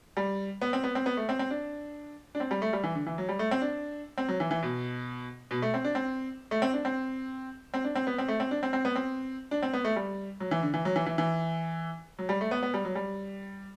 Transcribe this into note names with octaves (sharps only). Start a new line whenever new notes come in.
G3
B3
C4
B3
C4
B3
A3
C4
C4
D4
D4
C4
G3
A3
G3
E3
D3
E3
F#3
G3
A3
C4
D4
C4
F#3
E3
E3
B2
B2
A3
C4
D4
C4
A3
C4
D4
C4
C4
D4
C4
B3
C4
A3
C4
D4
C4
C4
B3
C4
D4
C4
B3
A3
G3
F#3
E3
D3
E3
F#3
E3
E3
E3
F#3
G3
A3
B3
B3
G3
F#3
G3